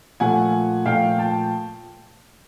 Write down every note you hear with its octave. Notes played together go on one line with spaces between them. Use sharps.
A#2 F3 A3 F#5 G#5
A#2 F3 A3 F5 G5
G5 A5